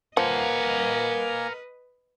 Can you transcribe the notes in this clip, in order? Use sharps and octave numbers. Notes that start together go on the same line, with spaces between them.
F3 A#3 A#4 B4 D#5 F#5 G#5